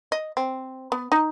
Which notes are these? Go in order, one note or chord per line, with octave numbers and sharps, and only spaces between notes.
D#5
C4
B3
D#4